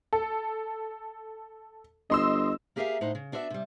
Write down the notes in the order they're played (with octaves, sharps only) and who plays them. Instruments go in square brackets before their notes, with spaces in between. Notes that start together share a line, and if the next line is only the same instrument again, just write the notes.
[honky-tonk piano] A4
[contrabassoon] G1 [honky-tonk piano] D#5 C6 E6
[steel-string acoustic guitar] A#3 G4 G#4 A#4 E5 F5
A2 D#4 C5 F#5
C#3
B3 D4 F#4 C5 E5
C3 G3